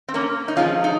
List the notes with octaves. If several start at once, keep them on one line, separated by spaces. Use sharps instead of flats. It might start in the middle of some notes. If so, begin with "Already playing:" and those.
C4
A#3 C#4
D#4
C3 F3 G#3 C#4 F4
D#4